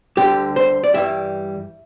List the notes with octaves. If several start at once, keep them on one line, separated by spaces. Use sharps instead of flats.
D2 D3 G3 G4
C5
D5
G2 E3 G3 E5